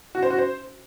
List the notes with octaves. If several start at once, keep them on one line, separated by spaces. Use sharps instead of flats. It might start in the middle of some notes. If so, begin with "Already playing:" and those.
F#4
C5
F#4
C5